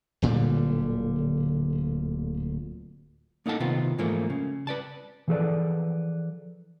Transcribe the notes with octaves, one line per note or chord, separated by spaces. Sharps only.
D1 A#2 D3 G3
A#3 D#4 A4 F#5 A5
C3 D#3 B3 C4 F4
G#2 E3 F3 A3 A#3
C#3
B4 D5 A5
E3 F3 G#4 A4 B4 D5